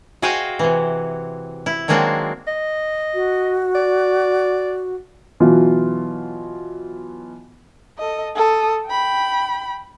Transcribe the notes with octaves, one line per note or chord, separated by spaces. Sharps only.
F#4 G#4 C5 D#5 F5 G5
C3 E3
E4
D#3 F#3 G#3 A#3 C4 D4
D#5
F#4
D5
B2 E3 F#3 F4
A4 D#5
A4 D#6
G5 B5